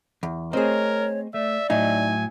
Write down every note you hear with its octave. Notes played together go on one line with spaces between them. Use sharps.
E2
A3 C4 G#4 A#4 C5 C#5 D#5
A3 D5 E5
A2 F#3 D#4 E5 G#5